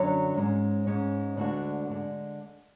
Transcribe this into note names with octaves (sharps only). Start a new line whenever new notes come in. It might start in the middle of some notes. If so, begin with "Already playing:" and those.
Already playing: F#2 D3 F#3 C#4 F#4
G#2 G#3 C#4
G#2 G#3 C#4
D2 D3 G#3 D4 F#4
D3 G#3 D4